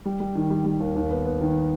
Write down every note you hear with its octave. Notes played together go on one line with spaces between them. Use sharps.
G3
G3
D#3
G3
G3
D#2
D#2
B3
B3
D#3